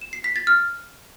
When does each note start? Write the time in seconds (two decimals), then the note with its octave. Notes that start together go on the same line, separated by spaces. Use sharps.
0.01 E7
0.13 C7
0.24 B6
0.36 A6
0.47 F6